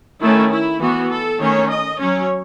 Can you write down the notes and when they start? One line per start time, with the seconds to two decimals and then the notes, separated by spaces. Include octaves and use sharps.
0.20 D#3 A3 C#4 E4
0.51 E4
0.80 E3 B3 F#4
1.09 A4
1.39 D#3 A3 C#4 C#5
1.69 D#5
1.98 F#3 C#4 C#5